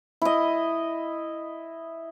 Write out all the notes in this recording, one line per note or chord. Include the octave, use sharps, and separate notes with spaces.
E4 D#5